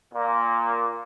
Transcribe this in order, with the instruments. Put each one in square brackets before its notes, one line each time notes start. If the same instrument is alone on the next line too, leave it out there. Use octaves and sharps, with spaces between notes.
[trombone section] A#2 A#3